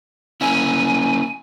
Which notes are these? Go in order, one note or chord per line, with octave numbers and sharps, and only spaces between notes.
A#3 C#4 E4 G#5